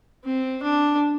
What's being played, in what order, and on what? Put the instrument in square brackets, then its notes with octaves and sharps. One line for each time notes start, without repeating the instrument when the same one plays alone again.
[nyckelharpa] C4
D4